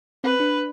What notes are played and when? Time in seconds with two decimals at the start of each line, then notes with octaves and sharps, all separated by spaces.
0.24 C4 B4
0.40 D4